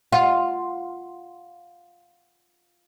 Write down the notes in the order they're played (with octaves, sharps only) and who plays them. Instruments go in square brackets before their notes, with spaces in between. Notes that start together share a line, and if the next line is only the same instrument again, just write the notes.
[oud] F4 [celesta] F#5